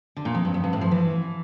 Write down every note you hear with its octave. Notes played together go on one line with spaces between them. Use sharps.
D3
A#2
F2
G2
F2
G2
A2
F3
E3